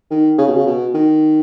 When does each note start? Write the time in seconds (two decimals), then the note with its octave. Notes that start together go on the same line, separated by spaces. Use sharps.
0.11 D#3
0.38 C#3
0.47 B2
0.55 C#3
0.66 B2
0.94 D#3